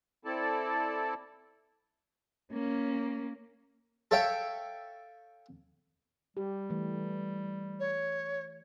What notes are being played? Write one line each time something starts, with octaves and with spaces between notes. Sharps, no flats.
C4 E4 A4 D5 A5
A#3 C#4
A4 C#5 E5 F5 G5
G3 G4
E3 A3
C#5